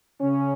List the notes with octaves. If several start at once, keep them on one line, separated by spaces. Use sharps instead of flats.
C#3 C#4